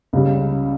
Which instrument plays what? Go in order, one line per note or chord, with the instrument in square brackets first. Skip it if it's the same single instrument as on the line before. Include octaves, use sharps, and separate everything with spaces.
[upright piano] C#2 C#3 G3